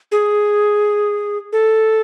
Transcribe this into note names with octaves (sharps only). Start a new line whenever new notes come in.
G#4
A4